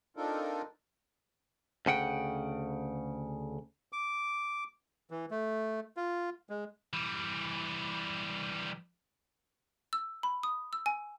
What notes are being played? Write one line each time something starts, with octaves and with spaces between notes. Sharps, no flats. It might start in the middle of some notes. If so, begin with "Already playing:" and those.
C4 D4 D#4 F4 A4 A#4
D2 C#3 F#5 G5
D6
E3
A3
F4
G#3
E3 G3
E6
B5
D#6
E6
G#5